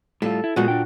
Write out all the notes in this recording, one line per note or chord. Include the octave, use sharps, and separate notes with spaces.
A2 G3 F4 A4
E4
A#2 G#3 B3 F#4 G#4
D4 G5